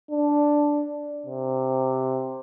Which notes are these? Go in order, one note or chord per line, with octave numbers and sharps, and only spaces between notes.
D4
C3